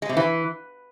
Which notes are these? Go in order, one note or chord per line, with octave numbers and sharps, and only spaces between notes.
G#3
C3
E3